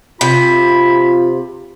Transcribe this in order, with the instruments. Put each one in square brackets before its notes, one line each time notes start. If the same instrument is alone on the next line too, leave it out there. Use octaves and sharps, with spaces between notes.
[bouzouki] C3 [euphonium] F4 [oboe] B5